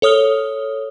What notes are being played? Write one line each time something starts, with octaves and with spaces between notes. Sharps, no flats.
A4 C#5 D#6 F6 G7